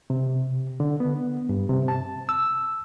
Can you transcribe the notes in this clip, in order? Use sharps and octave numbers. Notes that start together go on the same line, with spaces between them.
C3
D3
B3
G2
C3
A5
E6